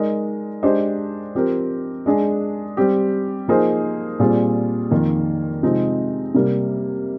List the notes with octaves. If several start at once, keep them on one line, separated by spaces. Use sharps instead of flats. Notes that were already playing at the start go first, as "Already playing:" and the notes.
Already playing: G#3 D#4 A#4 D5
G#3 D4 G4 C5 D#5
F3 C4 G4 A#4
G#3 D4 G#4
G3 C4 G4
F3 A#3 D#4 G#4 C5
A#2 G3 C4 F4 G#4
F2 D#3 A#3 F4 A#4
C3 F3 G#3 C4 D#4
C3 G3 A#3